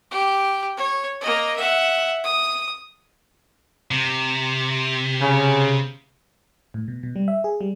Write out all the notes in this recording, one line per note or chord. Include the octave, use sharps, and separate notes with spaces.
G4
C#5
A#3 D#5
E5 F#5
D#6
C3
C#3
A2
B2
B2
G3
E5
G#4
G3